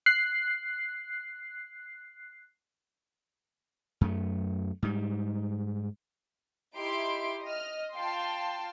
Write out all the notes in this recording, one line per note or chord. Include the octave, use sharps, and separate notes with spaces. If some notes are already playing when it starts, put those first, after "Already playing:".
F#6 C7
F#2 A3
G#2 G3
D#4 E4 G4 C6 D7
D#5 F6
F4 F5 G5 A5 C6